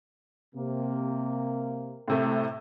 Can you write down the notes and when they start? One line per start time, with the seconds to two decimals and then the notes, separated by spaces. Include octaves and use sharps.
0.55 C3 A#3
2.08 A2 C3 A3